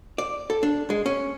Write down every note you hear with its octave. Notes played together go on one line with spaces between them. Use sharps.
D5
A4
D4
G#3
C#4